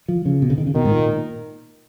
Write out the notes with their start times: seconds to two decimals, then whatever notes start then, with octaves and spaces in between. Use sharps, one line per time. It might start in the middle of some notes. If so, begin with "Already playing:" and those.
0.08 F3
0.25 C#3
0.42 B2
0.50 C#3
0.58 D#3
0.67 C#3
0.75 B2 D#3
0.85 G#2
0.91 A#2